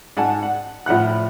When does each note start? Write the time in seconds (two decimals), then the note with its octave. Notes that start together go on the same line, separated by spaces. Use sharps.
0.17 G#2 F#5 G#5 A5
0.43 F#5
0.86 A2 F3 F#5 F#6